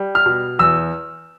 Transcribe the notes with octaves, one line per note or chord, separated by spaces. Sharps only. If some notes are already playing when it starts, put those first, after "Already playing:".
Already playing: G3
F6
B2
E2 E6